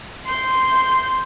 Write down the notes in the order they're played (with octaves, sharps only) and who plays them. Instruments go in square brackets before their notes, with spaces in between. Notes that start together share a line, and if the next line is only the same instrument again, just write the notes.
[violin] C6 G6